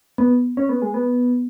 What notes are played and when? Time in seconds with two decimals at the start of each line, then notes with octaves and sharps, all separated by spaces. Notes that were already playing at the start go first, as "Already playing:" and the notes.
0.18 B3
0.57 C#4
0.69 B3
0.82 G#3
0.94 B3